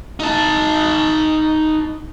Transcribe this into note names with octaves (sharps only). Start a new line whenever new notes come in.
D#4 A5